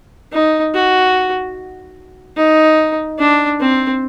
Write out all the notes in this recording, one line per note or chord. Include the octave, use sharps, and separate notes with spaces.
D#4
F#4
D#4
D4
C4